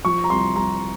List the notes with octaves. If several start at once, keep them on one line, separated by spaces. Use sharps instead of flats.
F3 C#6
A#5
C2 C6
C2 A#5